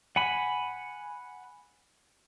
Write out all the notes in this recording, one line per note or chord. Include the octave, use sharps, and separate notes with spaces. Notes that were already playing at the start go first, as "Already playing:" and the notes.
F#5 G#5 B5